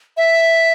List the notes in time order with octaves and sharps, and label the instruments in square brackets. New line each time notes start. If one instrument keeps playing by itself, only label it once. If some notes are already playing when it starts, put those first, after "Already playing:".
[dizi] E5